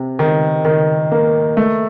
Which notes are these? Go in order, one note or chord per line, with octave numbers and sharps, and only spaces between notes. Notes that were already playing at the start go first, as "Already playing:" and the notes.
Already playing: C3
D#3
D#3
A#3
A3